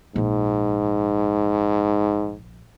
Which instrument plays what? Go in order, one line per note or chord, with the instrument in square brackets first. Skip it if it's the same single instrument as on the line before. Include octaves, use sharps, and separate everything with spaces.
[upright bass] A#1 F4 [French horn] G#2